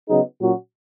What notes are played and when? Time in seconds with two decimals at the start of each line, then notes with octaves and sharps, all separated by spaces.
0.09 C#3 F#3 B3 D#4 G#4
0.41 A#2 F#3 C#4 F#4